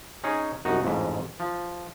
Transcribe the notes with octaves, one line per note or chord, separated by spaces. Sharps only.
C#4 D#4 G#4 C#5
C2 F#2 D#4 F#4
A1 F2 G#2
F3